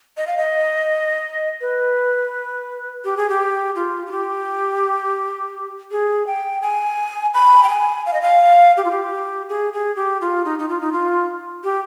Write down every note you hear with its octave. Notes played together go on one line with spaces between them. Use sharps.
D#5
F5
D#5
B4
G4
G#4
G4
F4
F4
G4
G#4
G5
G#5
B5
G5
G#5
F5
D#5
F5
G4
F4
G4
G#4
G#4
G4
F4
D#4
D#4
F4
D#4
F4
G4